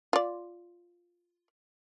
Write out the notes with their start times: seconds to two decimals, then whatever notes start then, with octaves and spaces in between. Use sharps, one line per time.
0.13 F4 D5